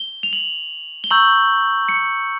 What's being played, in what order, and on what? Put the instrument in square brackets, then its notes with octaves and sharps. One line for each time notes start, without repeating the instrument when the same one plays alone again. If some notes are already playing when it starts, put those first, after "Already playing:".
Already playing: [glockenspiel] G7
F7
F#7
G7
A#5 C#6 E6 G6 F#7
C#7